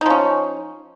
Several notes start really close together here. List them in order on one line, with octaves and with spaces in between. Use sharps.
D#4 F3 C#4